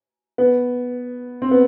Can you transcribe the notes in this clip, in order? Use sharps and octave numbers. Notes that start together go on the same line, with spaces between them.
B3
C4
B3